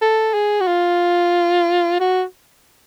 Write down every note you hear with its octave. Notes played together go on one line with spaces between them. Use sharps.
A4
G#4
F#4
F4
F#4